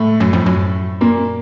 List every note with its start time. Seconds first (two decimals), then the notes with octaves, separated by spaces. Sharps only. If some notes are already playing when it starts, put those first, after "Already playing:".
Already playing: A2 A3
0.20 F#2
0.33 F2
0.46 F#2
1.01 A#2 A#3